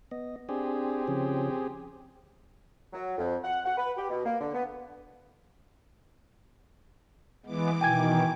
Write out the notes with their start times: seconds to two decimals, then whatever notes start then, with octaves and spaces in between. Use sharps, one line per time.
0.11 B3 D#5
0.49 C4 D4 G4 G#4
1.08 C#3 F3 C#4
2.93 F#3
3.18 F2
3.43 F#5
3.64 F#5
3.77 B4
3.97 G4
4.10 B2
4.25 A#3
4.40 D3
4.53 B3
7.46 E3 G#3 B3 D6
7.81 B2 D#3 G5 G#5 G#6